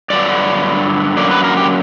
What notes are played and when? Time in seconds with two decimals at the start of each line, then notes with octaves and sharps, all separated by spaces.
0.10 G2 D3 F#3 B3 D5
1.17 F#2 D3 F#3 A#3 D5
1.31 B4
1.44 A#4
1.57 G4